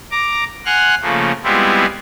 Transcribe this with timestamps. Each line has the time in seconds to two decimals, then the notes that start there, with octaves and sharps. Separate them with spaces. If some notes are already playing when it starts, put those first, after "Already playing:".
0.11 A#5 D6
0.66 F#5 G#5 C6 F6 F#6
1.02 C#3 F3 A3 A#3
1.43 G3 G#3 B3 C4 E4 F4